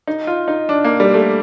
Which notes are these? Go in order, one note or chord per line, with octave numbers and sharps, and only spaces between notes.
D#4
F4
D#4
D4
A#3
G3
A3